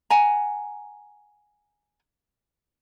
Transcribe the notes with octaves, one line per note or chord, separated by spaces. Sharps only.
F#5 G#5 A#5